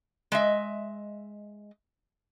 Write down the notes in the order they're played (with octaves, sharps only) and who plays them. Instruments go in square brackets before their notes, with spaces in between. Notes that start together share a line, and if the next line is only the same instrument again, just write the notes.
[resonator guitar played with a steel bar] G#3 D#5 E5